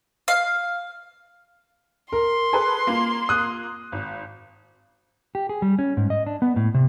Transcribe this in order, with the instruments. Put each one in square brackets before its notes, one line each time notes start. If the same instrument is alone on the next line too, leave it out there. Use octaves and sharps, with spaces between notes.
[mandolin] F5
[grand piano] A#4 [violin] C6
[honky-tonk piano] G#4 A4 B4
A#3 F4
[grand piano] D#6 F#6
[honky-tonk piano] G#1
[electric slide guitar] G4
G#4
G3
C#4
G#2
D#5
D4
B3
A2
C3